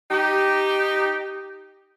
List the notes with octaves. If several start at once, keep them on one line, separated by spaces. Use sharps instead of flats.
D#4 G4